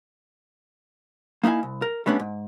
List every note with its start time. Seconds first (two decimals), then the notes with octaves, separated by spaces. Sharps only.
1.43 A#3 D#4 E4 F5 G#5
1.63 C2
1.82 A#4
2.06 G3 A3 B3 C#4 D4
2.20 G#2